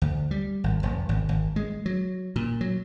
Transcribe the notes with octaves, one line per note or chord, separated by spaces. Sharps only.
D2
G3
G#1
F1
G#1
G#1
G#3
F#3
A#2
F#3